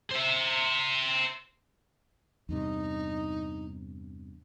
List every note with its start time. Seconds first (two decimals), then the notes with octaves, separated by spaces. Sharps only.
0.10 C5 E5
2.49 E2 G2 C3 D#4